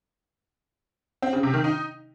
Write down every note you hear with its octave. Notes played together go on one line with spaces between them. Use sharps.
C4
C#3
C3
D#3
D#4